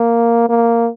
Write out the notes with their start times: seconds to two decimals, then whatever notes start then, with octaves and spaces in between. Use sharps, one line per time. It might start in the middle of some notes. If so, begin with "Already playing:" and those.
Already playing: A#3
0.49 A#3